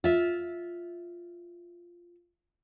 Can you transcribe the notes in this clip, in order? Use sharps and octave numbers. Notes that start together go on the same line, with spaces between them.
F4 E5